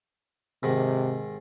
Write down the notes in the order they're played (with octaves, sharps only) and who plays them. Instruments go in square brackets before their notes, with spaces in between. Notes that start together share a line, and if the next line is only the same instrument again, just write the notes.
[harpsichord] G#2 D#3 [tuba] C3